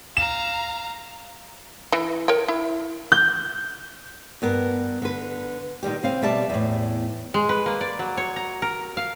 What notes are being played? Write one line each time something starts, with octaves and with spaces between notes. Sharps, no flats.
F5 A#5 E7
E3
A#4 C#5 G5
E4
G6
G2 B3 A#4
D3 B4
A#2 D#3 G3 G4
C#3 C4 F5
B2 G3 A#3 D5 E5 A5
E2 A2
G#3
B4
A#3
D5
F#3
C#5
A#5
A#4
F5